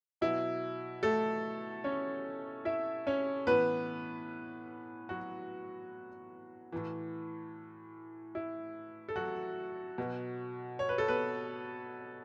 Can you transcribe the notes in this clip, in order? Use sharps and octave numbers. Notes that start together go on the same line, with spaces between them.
B2 F#3 E4
A3 A4
C#4 C#5
E4 E5
C#4 C#5
A2 E3 B3 B4
F#3 F#4
A2 E3
E4
A4
F#3 F#4
B2 F#3
C#5
B4
A4
B3 B4